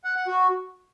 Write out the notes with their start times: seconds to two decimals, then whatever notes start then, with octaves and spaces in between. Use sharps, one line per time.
0.04 F#5
0.16 F#5
0.27 F#4